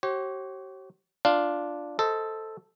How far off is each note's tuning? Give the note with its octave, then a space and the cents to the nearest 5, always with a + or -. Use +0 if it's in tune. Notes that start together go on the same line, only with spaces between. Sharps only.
G4 -45 C#5 -45
D4 +0 F4 +0 F5 +0
A4 +0 C5 +0 D#5 +25